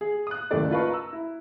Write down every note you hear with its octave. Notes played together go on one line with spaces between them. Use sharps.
G#4
D#6 F#6
F#1 D#2 A2 A3 D5
F4 A#4 B4 D#5 A5 C#6
A#5 E6
E4